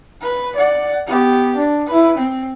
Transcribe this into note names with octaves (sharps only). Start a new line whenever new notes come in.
B4
D5 F#5
B3 G4
D4
E4 B4
C4